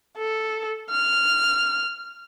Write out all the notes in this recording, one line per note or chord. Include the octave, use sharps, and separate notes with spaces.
A4
F6